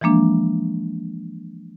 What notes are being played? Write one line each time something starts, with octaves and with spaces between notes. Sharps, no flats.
E3 F3 G#3 A#3 D4